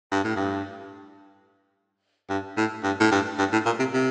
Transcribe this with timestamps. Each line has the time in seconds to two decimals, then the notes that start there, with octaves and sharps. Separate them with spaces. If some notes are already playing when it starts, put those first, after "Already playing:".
0.12 G2
0.24 A2
0.36 G2
2.30 G2
2.57 A2
2.83 G2
3.00 A2
3.11 G2
3.39 G2
3.52 A2
3.66 A#2
3.79 C3
3.93 C3